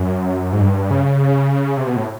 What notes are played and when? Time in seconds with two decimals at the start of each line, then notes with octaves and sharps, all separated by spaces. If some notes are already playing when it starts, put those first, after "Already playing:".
Already playing: F#2
0.53 G#2
0.61 G2
0.91 C#3
1.77 C3
1.87 B2
1.96 A2